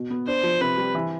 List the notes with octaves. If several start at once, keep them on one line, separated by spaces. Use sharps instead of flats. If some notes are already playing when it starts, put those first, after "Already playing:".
Already playing: B2
B3
D4 C5
F3
C3 B4
G3
E3